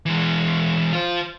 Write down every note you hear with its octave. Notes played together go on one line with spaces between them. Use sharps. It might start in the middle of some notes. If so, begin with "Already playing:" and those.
E3 G#3
F4 C5